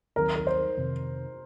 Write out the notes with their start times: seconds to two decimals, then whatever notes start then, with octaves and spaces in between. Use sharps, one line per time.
0.16 D#2 D#3 F#3 C4 A#4
0.35 A#4
0.47 C5
0.77 F2 C3 D#3